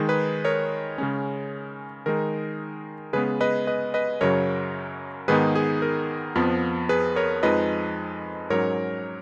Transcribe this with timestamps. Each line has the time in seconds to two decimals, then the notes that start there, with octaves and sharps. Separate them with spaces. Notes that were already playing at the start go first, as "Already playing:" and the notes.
Already playing: D#3 G#3 D#4
0.09 G#4 B4
0.45 A#4 C#5
0.98 C#3 G#3 C#4
2.06 D#3 G#3 D#4 A#4
3.13 C#3 G#3 B3 G#4 B4
3.41 B4 D#5
3.67 B4 D#5
3.94 B4 D#5
4.21 F#2 C#3 F#3 A#4 C#5
5.28 G#2 D#3 G#3 B3 D#4 G#4 B4
5.55 G#4
5.82 A#4
6.35 F2 F3 B3
6.89 G#4 B4
7.16 A#4 C#5
7.43 F2 F3 G#3 D#4 B4 D#5
8.50 G#2 F#3 C#4 A#4 C#5